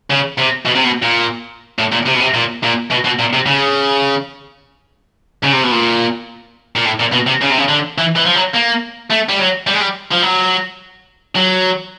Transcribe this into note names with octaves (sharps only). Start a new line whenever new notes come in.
C#3
C3
B2
C3
B2
A#2
A2
A#2
C3
B2
C3
A#2
A#2
B2
B2
A#2
C3
C#3
C#3
C3
B2
A#2
A#2
A2
A#2
B2
C3
C#3
C3
C#3
D3
E3
E3
F3
F#3
A#3
A3
G3
F#3
G3
G#3
G3
F3
F#3
F#3